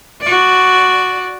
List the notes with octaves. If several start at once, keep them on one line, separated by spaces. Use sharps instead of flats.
F#4 D5